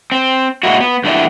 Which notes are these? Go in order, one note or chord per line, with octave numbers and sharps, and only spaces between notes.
C4
A#2 G#3 A#3 E4 F#4
B3
G2 E3 A3 B3 D5 E5